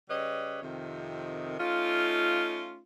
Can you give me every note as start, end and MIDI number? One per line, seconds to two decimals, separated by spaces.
0.09 0.60 49
0.09 0.60 55
0.09 0.60 71
0.09 0.60 73
0.09 0.60 75
0.62 1.56 41
0.62 1.56 48
0.62 1.56 51
1.58 2.80 57
1.58 2.80 61
1.58 2.80 63
1.58 2.80 65